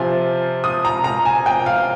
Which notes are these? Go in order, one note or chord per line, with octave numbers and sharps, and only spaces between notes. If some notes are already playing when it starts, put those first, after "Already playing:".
Already playing: C3 F3 C4 F4 G#5
D#6
A#5
A#5
G#5
G5
F5